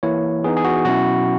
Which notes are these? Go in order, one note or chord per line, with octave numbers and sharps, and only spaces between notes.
E3 A#3 E4 C#5
E3 B3 D#4 G#4
G#4
F#4
B2 F#3 C#4 E4 F#4